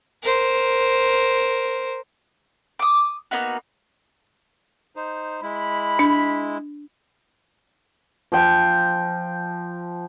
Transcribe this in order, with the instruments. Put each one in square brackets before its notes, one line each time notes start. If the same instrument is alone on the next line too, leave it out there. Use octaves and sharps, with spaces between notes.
[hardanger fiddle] A#4 C5
[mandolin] D6 D#6
A#3 B3 D#4 F#4
[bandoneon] D#4 C5
[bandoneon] G#3 E4 [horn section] B5
[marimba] D4
[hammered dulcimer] F3 G5